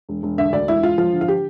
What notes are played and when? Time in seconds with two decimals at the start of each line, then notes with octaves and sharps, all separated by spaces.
0.09 E1
0.23 E1
0.38 D3 E5
0.53 D2 D5
0.68 E1 E4
0.83 E1 F4
0.98 F3 F4
1.13 D3
1.21 F4
1.28 G4